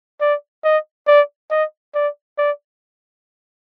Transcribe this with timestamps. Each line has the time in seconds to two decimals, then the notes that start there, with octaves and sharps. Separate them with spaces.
0.21 D5
0.64 D#5
1.08 D5
1.51 D#5
1.95 D5
2.38 D5